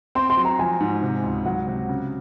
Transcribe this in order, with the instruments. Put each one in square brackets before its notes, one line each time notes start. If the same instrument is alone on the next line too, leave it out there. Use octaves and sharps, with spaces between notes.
[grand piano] C4 [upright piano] C6
[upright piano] C6
[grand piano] F#3
[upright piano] A#5
[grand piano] F3 [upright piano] G#5
[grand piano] G#2
C3
C#2
[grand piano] F#3 [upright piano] F#5
[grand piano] C3
C#3